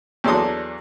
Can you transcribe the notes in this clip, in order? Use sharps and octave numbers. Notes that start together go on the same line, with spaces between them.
E2 F#3 D4 A4 C6 D#6